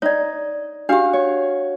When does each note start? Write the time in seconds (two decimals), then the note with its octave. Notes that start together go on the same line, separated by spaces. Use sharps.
0.02 D#4 C#5 D5
0.89 D4 F#4 G4 F5
1.13 C#5